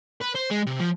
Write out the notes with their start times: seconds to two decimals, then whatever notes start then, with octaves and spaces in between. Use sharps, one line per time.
0.21 B4
0.35 C5
0.50 G#3
0.66 C3
0.80 F3